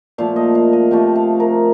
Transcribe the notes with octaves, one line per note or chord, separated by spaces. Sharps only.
A#2 F3 A3 F5
D#5
F5
D#5
C3 F3 A3 F5
F5
A#4